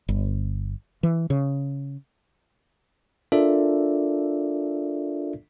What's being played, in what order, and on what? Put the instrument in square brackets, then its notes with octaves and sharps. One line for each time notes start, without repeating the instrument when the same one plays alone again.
[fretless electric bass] G1
E3
C#3
[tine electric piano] D4 F4 A4 A#4 D5 E5